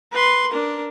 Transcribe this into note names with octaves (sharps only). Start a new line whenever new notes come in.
B4 C6
D4 A#4